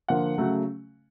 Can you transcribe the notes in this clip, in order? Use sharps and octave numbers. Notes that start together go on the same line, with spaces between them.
D3 F3 A#3 F#5
C#3 F#3 A3